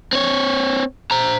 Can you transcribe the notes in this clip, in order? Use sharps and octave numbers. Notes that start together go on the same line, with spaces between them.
C4 C#5
C5 A#5